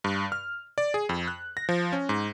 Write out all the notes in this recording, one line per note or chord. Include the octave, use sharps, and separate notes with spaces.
G2
F6
D5
G#4
F2
F#6
A#6
F3
C#4
G#2